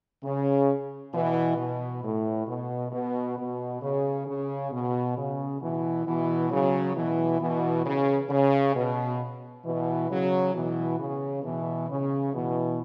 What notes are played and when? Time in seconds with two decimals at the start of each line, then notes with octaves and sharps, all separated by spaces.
0.24 C#3
1.14 B2 E3
1.57 B2
2.03 A2
2.47 B2
2.92 B2
3.38 B2
3.81 C#3
4.27 C#3
4.72 B2
5.16 C#3
5.61 B2 E3
6.05 B2 E3
6.51 C#3 F#3
6.96 B2 E3
7.40 B2 E3
7.85 C#3
8.30 C#3
8.75 B2
9.65 B2 E3
10.09 C#3 F#3
10.54 B2 E3
10.99 C#3
11.44 B2 E3
11.89 C#3
12.33 B2 E3